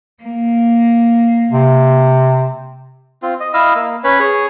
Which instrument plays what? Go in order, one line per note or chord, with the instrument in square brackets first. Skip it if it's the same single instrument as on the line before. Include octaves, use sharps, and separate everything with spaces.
[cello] A#3
[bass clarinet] C3
[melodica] C4 F4
D#5
E4 D#5 F5 E6
A#3
C#4 B4 C#5 B5
G#4 C#5